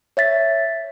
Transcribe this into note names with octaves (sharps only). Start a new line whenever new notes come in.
C#5 E5 A6 B6